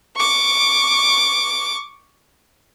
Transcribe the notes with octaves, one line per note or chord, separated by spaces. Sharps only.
C#6 D6